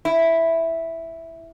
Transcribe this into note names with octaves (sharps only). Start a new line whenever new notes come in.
E4